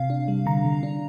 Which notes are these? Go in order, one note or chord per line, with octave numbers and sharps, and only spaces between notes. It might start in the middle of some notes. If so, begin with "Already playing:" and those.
Already playing: C3 F5
D4
G3
D3 A#5
D3
D4